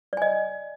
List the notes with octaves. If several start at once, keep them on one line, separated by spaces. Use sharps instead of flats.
D5 D#5 G#5